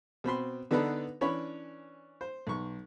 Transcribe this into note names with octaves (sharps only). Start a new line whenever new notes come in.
B2 C4 B5 C6
D3 B3 D4 D#4 A4 B4
E3 C#4 D4 C#5 B5
C5
B1 C#6